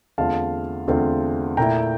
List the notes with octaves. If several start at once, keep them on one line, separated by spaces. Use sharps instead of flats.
E2 D3 A3 C4 F4 F5 A5
E2 D3 A3 C4 F4
A#2 A3 E4 G5 A#5